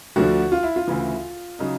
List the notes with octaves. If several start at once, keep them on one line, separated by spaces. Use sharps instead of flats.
D2 D3 F3 F#4
F4
E4
F4
D2 C#3 E3
C#3 F#3 D#4